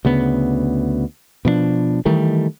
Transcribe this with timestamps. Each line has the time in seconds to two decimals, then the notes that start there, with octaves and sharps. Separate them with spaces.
0.05 D2 C#3 B3
1.45 B2 F3 C4 D4
2.05 D#3 E3 G3 A3